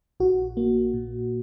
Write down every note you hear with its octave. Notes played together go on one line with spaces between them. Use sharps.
A#1 F#4
A#3
A#2